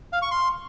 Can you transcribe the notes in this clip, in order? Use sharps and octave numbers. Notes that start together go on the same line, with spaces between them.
F5
C#6
C6